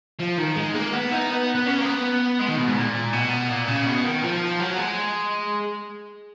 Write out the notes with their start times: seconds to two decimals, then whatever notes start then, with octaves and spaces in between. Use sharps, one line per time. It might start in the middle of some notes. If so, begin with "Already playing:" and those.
0.19 F3
0.37 D#3
0.56 G#3
0.74 A#3
0.93 B3
1.11 D#4
1.30 B3
1.55 B3
1.66 C#4
1.79 A#3
1.84 B3
2.40 G#3
2.49 D#3
2.58 B2
2.67 G#2
2.76 A#2
3.13 B2
3.50 A#2
3.68 C#3
3.87 B2
4.04 D#3
4.23 F3
4.60 F#3
4.78 G#3